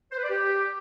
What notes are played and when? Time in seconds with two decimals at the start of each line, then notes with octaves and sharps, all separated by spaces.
0.12 C5
0.18 B4
0.24 D5
0.30 G4